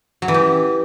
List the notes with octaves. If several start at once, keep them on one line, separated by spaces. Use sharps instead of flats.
F#3
E3
G4